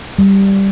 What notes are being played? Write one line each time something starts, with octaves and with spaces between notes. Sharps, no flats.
G3